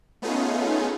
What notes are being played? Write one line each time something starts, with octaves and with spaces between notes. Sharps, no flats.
A3 B3 C#4 D#4 F4 G#4